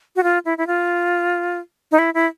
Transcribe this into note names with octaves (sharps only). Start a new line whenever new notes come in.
F#4
F4
E4
E4
F4
D#4
E4
E4